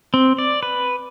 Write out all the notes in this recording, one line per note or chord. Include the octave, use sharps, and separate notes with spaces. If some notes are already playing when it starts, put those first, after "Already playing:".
C4
D5
B4